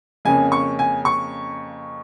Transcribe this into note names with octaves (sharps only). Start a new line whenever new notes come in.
F2 C#3 A#3 C#4 G#5
C#6
G#5
C#6